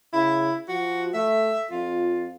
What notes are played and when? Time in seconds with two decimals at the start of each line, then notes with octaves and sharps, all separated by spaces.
0.13 C#3 E4
0.68 F3 F#4
1.14 A3 E5
1.71 F2 F4